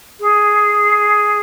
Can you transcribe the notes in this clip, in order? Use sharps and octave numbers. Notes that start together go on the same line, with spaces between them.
G#4